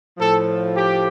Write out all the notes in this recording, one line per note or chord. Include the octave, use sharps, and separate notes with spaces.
A2 F3 A4
G4